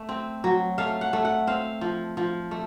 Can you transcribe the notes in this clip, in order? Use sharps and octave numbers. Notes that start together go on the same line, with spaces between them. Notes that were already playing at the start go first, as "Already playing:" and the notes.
Already playing: A3
C4
F#3
A3 F5
F#5
A3
F#5
C4 F5
F3
F3
A3